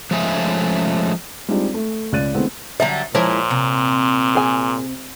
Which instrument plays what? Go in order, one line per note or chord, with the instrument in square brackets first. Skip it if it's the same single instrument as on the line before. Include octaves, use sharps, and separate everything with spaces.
[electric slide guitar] F3 G#3 A3 C#4 G#4 E5
[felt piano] G3 G#3 C4 D4 D#4 F4
A3
C#2 C#3 D5 F#6 A6 D#7
D3 E3 G#3 A3 B3 C4
[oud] D3 F#3 G3 [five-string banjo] E5 A#5
[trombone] A#2 [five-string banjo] F3 C#5 [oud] G#3 E4 A#4
[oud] C3
[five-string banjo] G#4 G#5